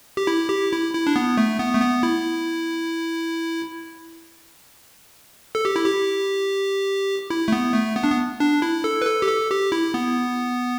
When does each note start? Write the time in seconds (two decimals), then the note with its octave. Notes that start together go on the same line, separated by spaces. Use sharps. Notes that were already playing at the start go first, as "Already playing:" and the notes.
0.17 G4
0.27 E4
0.50 G4
0.72 E4
0.94 E4
1.07 D4
1.16 B3
1.37 A3
1.59 B3
1.74 A3
1.82 B3
2.03 E4
5.55 A4
5.65 G4
5.76 E4
5.86 G4
7.30 E4
7.48 A3
7.52 B3
7.74 A3
7.96 B3
8.03 D4
8.10 B3
8.40 D4
8.62 E4
8.84 A4
9.02 B4
9.06 A4
9.22 G4
9.28 A4
9.50 G4
9.72 E4
9.94 B3